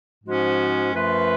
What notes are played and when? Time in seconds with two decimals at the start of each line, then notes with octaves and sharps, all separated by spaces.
0.24 G#2 F3 G#3 C#4 F#4
0.92 F#2 F3 A3 F4 B4